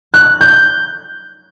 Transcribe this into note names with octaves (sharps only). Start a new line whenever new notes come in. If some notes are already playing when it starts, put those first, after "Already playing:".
F#6
G6